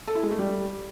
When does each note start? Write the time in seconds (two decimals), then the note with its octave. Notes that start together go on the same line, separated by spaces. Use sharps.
0.07 A4
0.15 E4
0.23 G#3
0.31 A3
0.39 G3